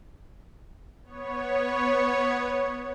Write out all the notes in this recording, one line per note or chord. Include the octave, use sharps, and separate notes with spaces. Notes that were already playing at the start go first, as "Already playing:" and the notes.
B3 C#5